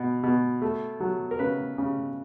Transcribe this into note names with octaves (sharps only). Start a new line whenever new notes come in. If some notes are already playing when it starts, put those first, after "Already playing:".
Already playing: B2
B2
A3
F#3
A#4
C#3 B4
C#3